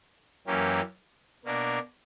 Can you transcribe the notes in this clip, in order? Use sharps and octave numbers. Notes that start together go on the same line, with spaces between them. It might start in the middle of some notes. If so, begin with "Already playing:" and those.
F#2 E3 A#3 C#4 G4
B2 A#3 D4 A#4